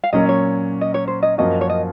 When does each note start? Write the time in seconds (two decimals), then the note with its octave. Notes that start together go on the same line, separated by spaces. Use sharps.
0.03 F5
0.13 A#2 F#3 C#4 D#5
0.29 C#5
0.81 D#5
0.94 C#5
1.08 C5
1.23 D#5
1.38 F#2 F3 A#3 C#4 F#4 D#5
1.61 C#5
1.70 D#5